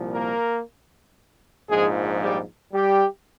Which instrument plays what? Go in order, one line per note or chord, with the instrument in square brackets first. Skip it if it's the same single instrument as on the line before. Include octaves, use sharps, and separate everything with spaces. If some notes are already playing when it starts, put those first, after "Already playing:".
Already playing: [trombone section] C2 A#2 F3
A#3 A#4
A#1 G#2 F3 G#3 G#4
G3 G4
G3 G4